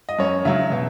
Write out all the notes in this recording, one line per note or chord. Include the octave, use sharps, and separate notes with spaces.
D#5
F#2 C#5
C#3 F#3 E5
B2